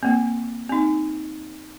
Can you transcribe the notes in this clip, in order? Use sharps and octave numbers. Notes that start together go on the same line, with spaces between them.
A#3 C4
C4 D#4